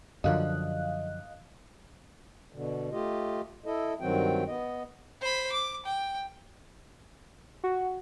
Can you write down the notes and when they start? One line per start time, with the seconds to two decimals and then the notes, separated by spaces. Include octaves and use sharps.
0.24 F#2 D3 F3 D#5 F5 F#6
2.53 B2 D3
2.92 A3 F4 G4 D#5
3.66 E4 A4 D#5
4.01 G2 D#3 F#3 C4 F#4 G5
4.47 B3 D#5
5.22 C5 B5
5.52 D6
5.86 G5
7.63 F#4